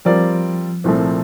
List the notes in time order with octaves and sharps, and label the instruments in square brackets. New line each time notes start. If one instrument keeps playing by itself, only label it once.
[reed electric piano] F3 [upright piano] G3 C4 F4 A#4 D5
[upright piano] C2 A#2 F3 A3 C4